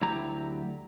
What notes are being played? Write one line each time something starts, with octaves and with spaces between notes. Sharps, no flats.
D2 F#3 E4 G4 A#5